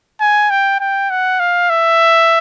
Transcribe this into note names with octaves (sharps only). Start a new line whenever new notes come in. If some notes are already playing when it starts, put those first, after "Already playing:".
G#5
G5
G5
F#5
F5
E5